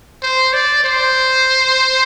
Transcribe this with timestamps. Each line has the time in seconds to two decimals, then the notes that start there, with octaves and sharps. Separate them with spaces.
0.23 C5
0.53 D5
0.84 C5